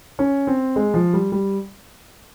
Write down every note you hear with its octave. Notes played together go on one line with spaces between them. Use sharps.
C#4
C4
G#3
F3
G3
G3